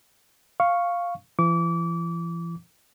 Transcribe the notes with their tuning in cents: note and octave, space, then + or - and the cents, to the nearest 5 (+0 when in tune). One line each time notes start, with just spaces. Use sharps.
F5 +0 C#6 +0
E3 +40 D6 -30